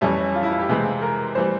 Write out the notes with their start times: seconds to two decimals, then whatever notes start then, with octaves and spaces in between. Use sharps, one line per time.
0.01 F2 E3 G3 C#4 E5
0.35 F4
0.43 E4
0.52 F4
0.60 G4
0.68 C3 E3 G#3 C4
1.01 A#4
1.35 E3 G3 C5